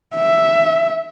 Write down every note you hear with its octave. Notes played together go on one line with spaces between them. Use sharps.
E5